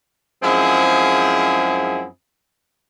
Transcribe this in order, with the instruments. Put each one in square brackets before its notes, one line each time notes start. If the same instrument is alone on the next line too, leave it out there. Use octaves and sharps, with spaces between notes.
[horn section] F#2 F3 G#3 C4 E4 G#4